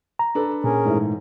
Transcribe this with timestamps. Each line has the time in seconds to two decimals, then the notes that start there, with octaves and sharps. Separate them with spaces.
0.19 A#5
0.35 D4 A4 B4
0.64 A#2 C#4 G#4 A#4
0.85 G#2 E3 A3